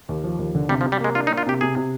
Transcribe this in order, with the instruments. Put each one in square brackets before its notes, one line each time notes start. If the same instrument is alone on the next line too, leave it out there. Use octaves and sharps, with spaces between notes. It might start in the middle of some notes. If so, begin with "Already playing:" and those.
[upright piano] D#2
F3
D#2
D3
[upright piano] C3 [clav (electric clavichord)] G3
[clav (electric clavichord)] F3
[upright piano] C3
[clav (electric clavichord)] G3
[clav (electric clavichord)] G#3 [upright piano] A#3
[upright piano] D4 [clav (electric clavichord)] F4
[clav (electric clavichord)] D#4
[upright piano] A#3
[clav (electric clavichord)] F4
[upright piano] C3 [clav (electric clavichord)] G4
[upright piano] C3 [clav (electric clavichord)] G#4
[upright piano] C3